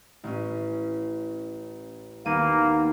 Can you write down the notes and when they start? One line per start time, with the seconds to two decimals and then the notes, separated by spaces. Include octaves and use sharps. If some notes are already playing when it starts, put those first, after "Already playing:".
0.24 A1 C#4
2.25 D#2 A#3 B3 D#7